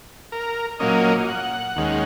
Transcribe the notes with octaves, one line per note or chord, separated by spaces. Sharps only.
A#4
A#2 F#3 A#3 C#4 D#5
F#5
D#2 D#3 G#3 C#4